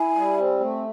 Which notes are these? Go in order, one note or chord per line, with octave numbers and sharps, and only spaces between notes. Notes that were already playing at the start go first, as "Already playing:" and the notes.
Already playing: E4 G#5
G3
C4
A3